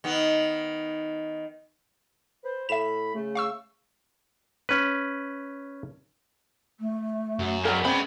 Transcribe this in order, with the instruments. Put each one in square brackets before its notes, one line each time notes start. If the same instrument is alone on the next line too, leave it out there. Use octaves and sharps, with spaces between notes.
[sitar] D#3 B3
[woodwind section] B4 C5
[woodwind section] A2 B5 [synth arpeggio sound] E5 E7
[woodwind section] C#3 A3
[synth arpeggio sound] F5 C#6 E6
[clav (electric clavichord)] C#4 B4
[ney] A3
[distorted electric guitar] F#2
[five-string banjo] F#3 A#4 [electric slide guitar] G#3 B3 D4
[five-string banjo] C4 [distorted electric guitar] C#4 B5